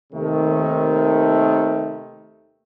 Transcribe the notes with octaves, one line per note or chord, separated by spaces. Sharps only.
D#2 C3 D#3 A3